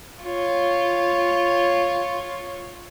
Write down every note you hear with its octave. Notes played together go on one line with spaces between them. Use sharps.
F4 C#5